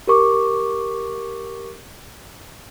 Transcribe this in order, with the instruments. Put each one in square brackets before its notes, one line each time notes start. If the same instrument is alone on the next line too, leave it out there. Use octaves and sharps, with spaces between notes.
[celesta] G4 A#4 C#6 D6